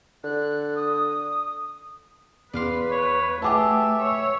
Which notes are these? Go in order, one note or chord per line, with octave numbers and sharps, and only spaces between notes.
D3 F#6
D#6
E2 B4 D5 F5 C6
C#5
A3 G4 G#4 B4 E5 F#5 A5 D6
C#5